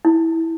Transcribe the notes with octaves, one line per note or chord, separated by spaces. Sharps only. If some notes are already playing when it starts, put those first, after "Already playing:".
E4